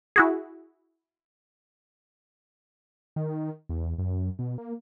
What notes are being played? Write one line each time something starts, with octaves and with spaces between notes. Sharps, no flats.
E4 F#4 G#4
D#3
E2
F#2
B2
A#3